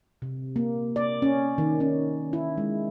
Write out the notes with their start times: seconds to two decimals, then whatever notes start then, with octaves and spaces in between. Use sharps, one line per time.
0.22 C3
0.56 A#3
0.96 D5
1.22 C#4
1.58 D#3
1.80 C#4
2.33 E4
2.58 G#3